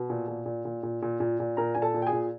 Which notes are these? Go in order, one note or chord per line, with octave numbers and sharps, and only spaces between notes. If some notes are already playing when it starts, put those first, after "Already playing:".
Already playing: B2
A#2
A#2
A#2
A#2
A#2
A#2
A#2
A#2
A#2 A#4 A#5
A#2 G#5
A4 A5
A#2
G5
G#4 G#5
A#2